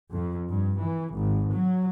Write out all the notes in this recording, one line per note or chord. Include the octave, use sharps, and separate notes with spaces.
F2
G2
E3
G#1
F#3